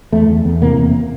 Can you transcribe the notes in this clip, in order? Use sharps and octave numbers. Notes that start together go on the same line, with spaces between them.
E2 A3
E2
E2
C3 A#3
E2